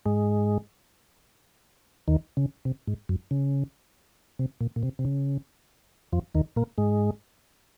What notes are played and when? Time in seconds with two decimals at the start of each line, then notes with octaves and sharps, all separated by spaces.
0.06 G#2 G#3
2.08 D#2 D#3
2.37 C#3
2.65 C3
2.87 G#2
3.09 F#2
3.31 C#3
4.39 C3
4.61 A#2
4.76 A#2
4.83 C3
4.99 C3
5.05 C#3
6.12 F2 F3
6.35 D#2 D#3
6.56 A#2 A#3
6.78 G#2 G#3